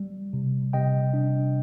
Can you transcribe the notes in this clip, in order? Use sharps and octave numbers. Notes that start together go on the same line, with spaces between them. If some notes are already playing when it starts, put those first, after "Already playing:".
Already playing: G3
C3
C3 D#5 G5
D4